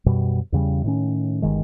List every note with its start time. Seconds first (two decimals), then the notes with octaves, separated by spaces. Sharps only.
0.06 F#2 B2 G3
0.52 E2 C#3 G3
0.84 A2 D#3 C#4
1.42 G1 D#3 G#3